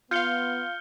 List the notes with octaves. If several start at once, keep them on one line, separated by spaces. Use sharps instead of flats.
B3 F4 F5 F6 G6 C#7 G7